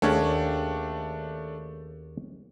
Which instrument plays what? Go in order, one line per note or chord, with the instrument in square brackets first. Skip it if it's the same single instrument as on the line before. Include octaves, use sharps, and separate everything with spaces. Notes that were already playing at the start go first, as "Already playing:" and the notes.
[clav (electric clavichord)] D#2 C#4 G#4 [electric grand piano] A3 D4